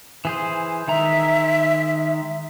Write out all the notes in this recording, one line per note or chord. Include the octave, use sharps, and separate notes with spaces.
E3 G#4 C5
D#3 G#3 E5 A#5